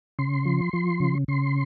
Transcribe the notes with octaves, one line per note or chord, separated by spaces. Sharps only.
C#3 C6
F3
F3
C#3
C#3 C6